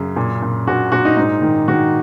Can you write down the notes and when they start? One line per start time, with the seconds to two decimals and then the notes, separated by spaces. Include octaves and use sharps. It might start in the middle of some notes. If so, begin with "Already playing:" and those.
Already playing: F#2 C#3
0.16 A#2
0.42 A#2
0.67 A#2 F#4
0.92 A#2 F#4
1.05 D#4
1.17 G#2 D#4
1.42 D#3
1.68 D#3 F#4